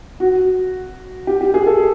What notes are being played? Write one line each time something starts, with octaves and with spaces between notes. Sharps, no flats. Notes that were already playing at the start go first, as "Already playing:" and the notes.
F#4
G4
G4
G#4
A4